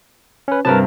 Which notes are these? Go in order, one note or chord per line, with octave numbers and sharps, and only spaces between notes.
C#4 B4
G2 C3 A#4 B4 A5